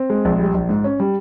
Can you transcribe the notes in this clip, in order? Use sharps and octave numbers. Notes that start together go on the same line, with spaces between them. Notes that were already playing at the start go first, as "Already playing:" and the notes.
Already playing: C4
G#3
A#1
G3
A#1
G#2
C#4
G3